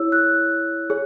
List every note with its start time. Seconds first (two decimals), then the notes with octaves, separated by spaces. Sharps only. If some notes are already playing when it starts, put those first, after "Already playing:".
Already playing: E4 G#4 C#5 E6
0.12 F#6
0.90 G#4 C#5